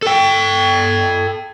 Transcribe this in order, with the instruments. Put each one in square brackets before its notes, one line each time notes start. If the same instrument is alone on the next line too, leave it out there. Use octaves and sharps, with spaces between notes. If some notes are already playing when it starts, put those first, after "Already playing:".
[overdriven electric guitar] A4 G5